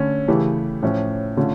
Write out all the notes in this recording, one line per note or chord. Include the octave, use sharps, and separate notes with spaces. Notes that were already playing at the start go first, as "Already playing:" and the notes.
Already playing: D3 A3 C#4
C#3 E3 A3 E4 G4
A2 F3 C#4
D3 A3 C#4 F4